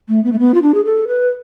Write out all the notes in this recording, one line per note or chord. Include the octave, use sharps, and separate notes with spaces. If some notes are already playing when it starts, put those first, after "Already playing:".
A3
B3
A3
B3
F4
D4
G#4
A4
B4